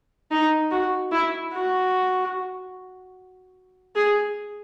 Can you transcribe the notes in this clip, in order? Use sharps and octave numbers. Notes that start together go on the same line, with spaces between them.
D#4
F#4
E4
F#4
G#4